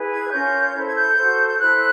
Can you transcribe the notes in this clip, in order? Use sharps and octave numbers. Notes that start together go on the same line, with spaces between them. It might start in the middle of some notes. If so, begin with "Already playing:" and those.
Already playing: E4 G#4 B4
G#6
F#6
C#4 F4 A#4 C#5 G6
E4 A4 C5
G#6
G6
F#4 A4 C5
G6
E4 A4 C5 F#6